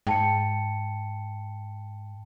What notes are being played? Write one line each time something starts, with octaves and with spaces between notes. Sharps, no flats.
G#2 G5 A5 C#7